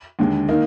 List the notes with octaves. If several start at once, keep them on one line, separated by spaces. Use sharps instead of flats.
D#2 D3 G#3
D#3 A#3 D#4